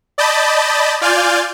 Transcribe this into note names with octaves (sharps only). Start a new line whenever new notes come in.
D5 D#5 A5 B5 G6 A6
F4 D5 G#5 F6 G6 A6